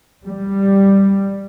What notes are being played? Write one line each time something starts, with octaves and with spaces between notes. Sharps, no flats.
G3